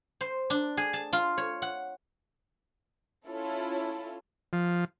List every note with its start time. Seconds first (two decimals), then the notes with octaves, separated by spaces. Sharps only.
0.21 C5
0.50 D4
0.77 G#4
0.93 A5
1.13 F4
1.38 C#5
1.62 F#5
3.27 C#4 E4 F4 A4 C#5
4.53 F3